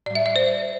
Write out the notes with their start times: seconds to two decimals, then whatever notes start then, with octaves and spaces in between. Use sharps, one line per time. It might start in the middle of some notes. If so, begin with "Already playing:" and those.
0.06 A2 D5
0.10 G3
0.15 E5
0.26 D5
0.36 C5